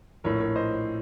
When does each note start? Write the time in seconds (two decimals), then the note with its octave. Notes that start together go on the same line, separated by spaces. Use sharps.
0.24 A#1 A2 A#4 C#5
0.40 A#4 C#5
0.56 C5 D#5